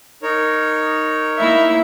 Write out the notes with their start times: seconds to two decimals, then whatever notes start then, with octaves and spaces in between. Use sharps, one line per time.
0.22 D#4 A#4 C#5
1.38 A#3 E4 E5